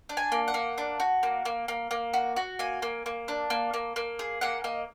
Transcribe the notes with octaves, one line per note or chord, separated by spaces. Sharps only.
D4
G#5
A#3
F#5
A#3
D4
F#4
A#3
A#3
A#3
A#3
F#4
F#4
A#3 G#5
A#3
A#3
D4
A#3
A#3
A#3
G#4
A#3 F#5
A#3 D#5